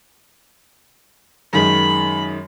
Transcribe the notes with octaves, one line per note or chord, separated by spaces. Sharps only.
F#2 D#3 G#3 B5